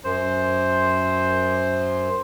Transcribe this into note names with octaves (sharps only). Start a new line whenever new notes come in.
F#2 C5